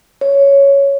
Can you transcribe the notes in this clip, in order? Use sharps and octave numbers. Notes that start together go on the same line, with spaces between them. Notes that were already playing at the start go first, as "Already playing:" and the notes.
C#5